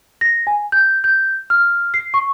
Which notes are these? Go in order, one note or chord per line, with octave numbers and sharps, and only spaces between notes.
A#6
G#5
G6
G6
F6
C7
C#6